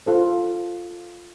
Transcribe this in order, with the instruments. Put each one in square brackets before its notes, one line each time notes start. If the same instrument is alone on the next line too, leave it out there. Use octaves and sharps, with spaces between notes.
[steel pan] F4 A4 C5